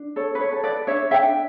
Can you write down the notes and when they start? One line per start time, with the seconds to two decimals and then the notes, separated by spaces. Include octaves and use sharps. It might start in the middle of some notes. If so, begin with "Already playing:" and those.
Already playing: D4
0.16 A4 C#5
0.35 B4
0.40 C#5
0.52 A4
0.64 B4 D5
0.87 D4 C#5 E5
1.11 E5 G5
1.23 D4